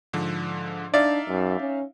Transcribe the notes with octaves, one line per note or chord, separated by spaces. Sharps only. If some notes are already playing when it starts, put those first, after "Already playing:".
G#2 D3 F3
D4 D#4 D5 E5 F5
F#2
C#4